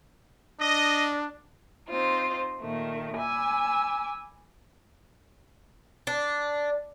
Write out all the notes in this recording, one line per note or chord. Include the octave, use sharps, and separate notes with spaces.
D4 D#5
C4 D#4 F4 C5
A#2 D#3 A3
G#5 B5 D6 E6
D4